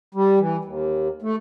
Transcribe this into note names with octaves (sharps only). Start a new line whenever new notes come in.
G3
E3
D#2
A3